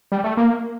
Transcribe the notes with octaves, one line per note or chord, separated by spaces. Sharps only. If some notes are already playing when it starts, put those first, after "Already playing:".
G3
A3
A#3